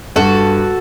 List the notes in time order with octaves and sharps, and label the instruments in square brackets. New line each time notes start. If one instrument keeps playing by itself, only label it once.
[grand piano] G2 [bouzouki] F#4 A4